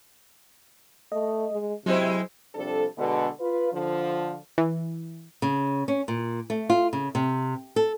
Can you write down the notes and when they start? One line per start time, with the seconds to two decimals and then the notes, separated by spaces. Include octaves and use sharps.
1.12 A3 D#5
1.51 G#3
1.86 C3 F#3 G#3 C4 E4 C5
2.55 C3 F3 G3 D4 A4
2.98 B2 D3 G#3
3.40 F4 B4
3.72 D3 F3
4.58 E3
5.42 C#3
5.88 C#4
6.08 A#2
6.50 A3
6.70 F4
6.93 C#3
7.15 C3
7.76 A4